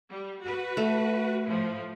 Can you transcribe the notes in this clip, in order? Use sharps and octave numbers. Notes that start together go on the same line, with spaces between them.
G3
F#4 B4
A3
A2 F3